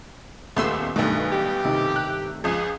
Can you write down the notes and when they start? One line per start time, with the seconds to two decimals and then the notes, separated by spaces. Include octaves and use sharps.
0.56 D#1 C#2 A3 B3 C6 E6
0.96 B1 G2 B2 D#3 A3
1.30 G4
1.64 C3 D#3
1.96 F#6
2.44 C#2 F3 G#4